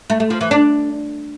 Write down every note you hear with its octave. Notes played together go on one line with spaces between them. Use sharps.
A3
A3
F3
E3
D4